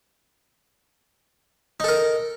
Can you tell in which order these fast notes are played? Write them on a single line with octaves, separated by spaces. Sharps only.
D#4 A4 A#4